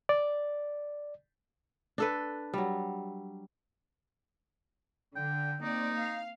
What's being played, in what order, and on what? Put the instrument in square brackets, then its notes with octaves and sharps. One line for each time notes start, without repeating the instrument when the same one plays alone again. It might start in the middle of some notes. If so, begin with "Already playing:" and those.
[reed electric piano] D5
[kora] D4 A4 B4
F#3 G3
[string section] D3 [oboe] G5
[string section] A#3 C4 D5 [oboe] D#4
[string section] F5